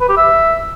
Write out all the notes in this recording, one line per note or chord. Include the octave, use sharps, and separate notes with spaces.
B4
G4
E5